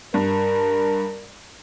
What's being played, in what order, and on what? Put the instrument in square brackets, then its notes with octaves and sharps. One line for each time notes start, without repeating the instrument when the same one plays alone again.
[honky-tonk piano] G2 [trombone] A#4